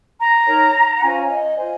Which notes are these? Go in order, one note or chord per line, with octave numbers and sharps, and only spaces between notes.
A#5
D#4 A#4 C#5
F#5
C#4 F4 C5 G#5
F5
D#5
F4 C5 G#5